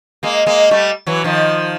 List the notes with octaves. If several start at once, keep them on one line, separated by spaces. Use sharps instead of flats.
G#3 A#3
G#3 A#3
G3 A3
E3 F#3
D#3 F3